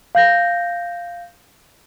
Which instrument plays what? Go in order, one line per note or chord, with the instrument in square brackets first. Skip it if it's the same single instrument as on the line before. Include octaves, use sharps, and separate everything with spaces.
[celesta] F5 G6 A#6